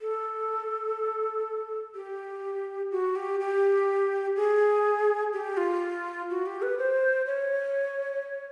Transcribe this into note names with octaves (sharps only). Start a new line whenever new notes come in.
A4
G4
F#4
G4
G4
G#4
G4
F4
F#4
G4
B4
C5
C#5